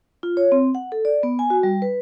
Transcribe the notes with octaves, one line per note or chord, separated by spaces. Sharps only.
F4
C#5
C4
F#5
A4
D5
B3
G#5
F#4
G3
B4